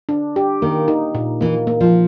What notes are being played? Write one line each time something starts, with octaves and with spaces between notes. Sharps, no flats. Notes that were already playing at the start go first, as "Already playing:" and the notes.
D4
G4
D#3 A#3
D#4
A#2
E3 A#3
A#3
F3